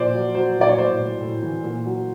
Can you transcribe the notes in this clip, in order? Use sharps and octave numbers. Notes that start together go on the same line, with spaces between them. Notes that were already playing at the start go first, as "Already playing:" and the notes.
Already playing: A#2 F3 C5 D5
F#3
F#3 C5
A#2 D5
C#5
A2 C5
A2
A2
E3
A#2
F#3